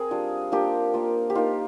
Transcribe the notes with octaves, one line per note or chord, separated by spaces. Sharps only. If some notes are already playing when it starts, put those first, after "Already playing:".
Already playing: C4 G#4 A#4
G3 D4 F4
A#3 D4 F4 G4
A#3 F4
G4
A#3 D#4 F4